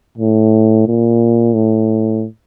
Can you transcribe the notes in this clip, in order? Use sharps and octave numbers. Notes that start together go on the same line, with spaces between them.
A2
A#2
A2